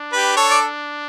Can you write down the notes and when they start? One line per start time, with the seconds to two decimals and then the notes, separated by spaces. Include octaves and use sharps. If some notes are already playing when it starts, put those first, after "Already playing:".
Already playing: D4
0.13 G4 B4
0.37 A4 C#5
0.50 D5